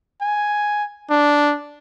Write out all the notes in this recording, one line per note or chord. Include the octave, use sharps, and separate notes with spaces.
G#5
D4